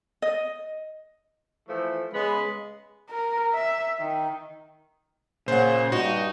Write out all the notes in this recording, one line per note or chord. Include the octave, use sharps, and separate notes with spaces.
D#5
E3 F3 A3
C#3 G#3 B3 B5
A#4
E5
D#3
A#2 C#3 C5 F#5
G2 D#4 F#4